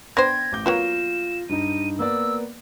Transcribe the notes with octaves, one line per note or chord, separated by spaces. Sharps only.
B3 D4 C5 G5 G#6 A#6
A1 D6 G6
F#3 A#3 B3 F4 E7
G2 D#4 D#7
A#3 B3 D5 E6